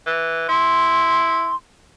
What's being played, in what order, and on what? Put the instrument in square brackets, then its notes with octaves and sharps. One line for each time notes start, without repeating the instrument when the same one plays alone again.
[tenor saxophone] E3
[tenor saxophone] E4 [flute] C6